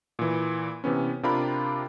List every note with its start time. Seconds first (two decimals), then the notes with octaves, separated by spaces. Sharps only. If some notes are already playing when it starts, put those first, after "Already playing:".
0.19 A#2 E3
0.84 C3 E3 B3 C#4
1.23 C3 D4 F4 G4 A#4 B5